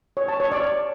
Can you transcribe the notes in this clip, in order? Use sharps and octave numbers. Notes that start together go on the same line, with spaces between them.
C#5
A5
C#5
D5